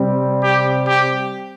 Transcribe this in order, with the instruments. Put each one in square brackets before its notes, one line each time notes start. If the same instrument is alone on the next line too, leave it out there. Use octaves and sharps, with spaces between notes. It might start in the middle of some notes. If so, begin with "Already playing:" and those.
Already playing: [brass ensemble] C3 G3 C4
[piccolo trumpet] G4
G4